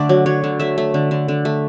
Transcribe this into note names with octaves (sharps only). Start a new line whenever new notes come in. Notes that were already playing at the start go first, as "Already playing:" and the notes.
Already playing: D3 A3 D5
F#3
F#3 C#5
D3
A3 E5
A3
D3
D3
D3
A3